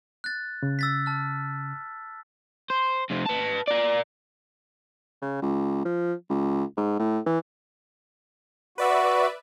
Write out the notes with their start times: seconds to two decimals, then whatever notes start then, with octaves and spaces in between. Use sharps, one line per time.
0.24 F#6 A6
0.63 C#3
0.79 E6 A6 B6
1.06 A5 F6
2.70 C5
3.11 F2 C3
3.26 B4 A5
3.68 A#4 D5
5.22 C#3
5.42 C#2
5.85 F3
6.29 C#2
6.77 G#2
6.99 A2
7.26 E3
8.78 F#4 B4 D5 E5